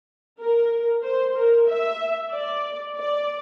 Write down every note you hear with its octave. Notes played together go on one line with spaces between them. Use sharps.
A#4
C5
A#4
E5
D5
D5